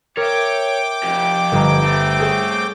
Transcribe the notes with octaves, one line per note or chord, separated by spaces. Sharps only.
A#4 C#5 E5 G5 D6
F2 G4
G1 F4 A#5
A3 C4
G#4 A4 C#5